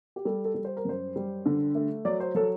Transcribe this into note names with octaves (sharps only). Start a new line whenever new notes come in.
G4
G3 A4
A4
G3
C5
A#4
F#2 C5
G3
D3
A3
F#3 D5
C5
F#3 A4